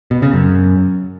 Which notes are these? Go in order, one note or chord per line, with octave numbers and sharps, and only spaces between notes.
B2
C#3
F#2